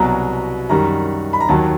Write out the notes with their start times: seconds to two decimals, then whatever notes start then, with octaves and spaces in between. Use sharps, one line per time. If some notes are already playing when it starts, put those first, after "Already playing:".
Already playing: C2 B2 F#3 A#5
0.69 F#2 D#3 G3 A#5
1.33 B5
1.40 A#5
1.48 D#2 D#3 F#3 A5